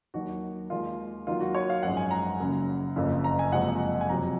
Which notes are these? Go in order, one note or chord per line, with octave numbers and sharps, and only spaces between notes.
D#2 D#3 F#3 F#4
D#2 D#3 G#3 F4
D#2 D#3 F#3 F4
F#4
C#5
F5
G#1 F#2 F3 G#3 F#5
G#5
A#5
F#1 F#2 C#3
F#1 F2 C#3
A#5
G#5
F#1 F2 C3 F3 G#3 F#5
G#5
F2 C3 F#3 A#5